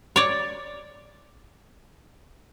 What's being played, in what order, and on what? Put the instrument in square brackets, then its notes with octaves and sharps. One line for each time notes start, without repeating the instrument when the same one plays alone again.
[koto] C#5 D5